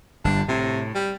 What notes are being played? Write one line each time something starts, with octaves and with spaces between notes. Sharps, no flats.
G1 G3 D4
A2 C3
G3